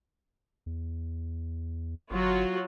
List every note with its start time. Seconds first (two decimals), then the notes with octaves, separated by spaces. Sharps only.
0.66 E2
2.11 G1 F#3 F4 F#4